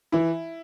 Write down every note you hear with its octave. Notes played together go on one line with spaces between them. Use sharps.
E3 E4